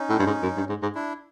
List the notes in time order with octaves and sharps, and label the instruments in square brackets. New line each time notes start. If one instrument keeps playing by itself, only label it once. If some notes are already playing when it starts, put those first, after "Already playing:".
Already playing: [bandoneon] C#4 D#4
[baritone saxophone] A2
G2
G#2
F#2
G2
G#2
G#2
[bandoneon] D4 E4